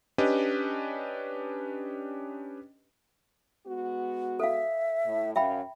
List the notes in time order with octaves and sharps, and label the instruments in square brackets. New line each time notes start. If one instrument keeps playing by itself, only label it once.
[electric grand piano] C#4 D4 G4 B4 D#5
[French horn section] G#3 B3 F#4
[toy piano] A4 F5 [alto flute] E5
[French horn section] A2
[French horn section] F#2 C#4 [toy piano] E5 G5 B5 [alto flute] F5